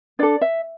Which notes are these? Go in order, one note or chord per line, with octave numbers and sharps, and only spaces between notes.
D4 A4 D5
E5